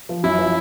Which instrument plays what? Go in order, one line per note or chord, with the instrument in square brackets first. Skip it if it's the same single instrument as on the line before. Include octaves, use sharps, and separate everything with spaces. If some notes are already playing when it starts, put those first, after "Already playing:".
[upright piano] F3
[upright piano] F#2 [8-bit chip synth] E4
[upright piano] F3